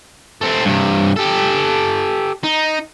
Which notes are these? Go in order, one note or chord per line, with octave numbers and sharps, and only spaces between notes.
A3 C4
G2 C3
G4 A4
D#4